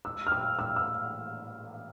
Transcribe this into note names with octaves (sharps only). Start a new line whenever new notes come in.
E6
F6
E6
E6
E6